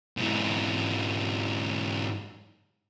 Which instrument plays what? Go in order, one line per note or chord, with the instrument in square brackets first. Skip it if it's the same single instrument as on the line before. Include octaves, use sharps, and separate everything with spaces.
[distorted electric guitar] G#2 E3